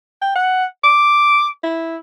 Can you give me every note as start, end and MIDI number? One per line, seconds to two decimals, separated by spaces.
0.22 0.33 79
0.36 0.65 78
0.84 1.47 86
1.64 1.97 64